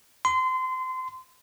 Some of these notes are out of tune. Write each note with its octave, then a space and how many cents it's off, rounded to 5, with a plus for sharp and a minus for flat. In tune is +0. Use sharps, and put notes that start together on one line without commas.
C6 -25